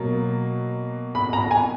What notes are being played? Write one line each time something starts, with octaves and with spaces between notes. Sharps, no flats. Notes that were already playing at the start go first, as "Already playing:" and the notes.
Already playing: B2 F#3 A#3
B5
A#5
G#5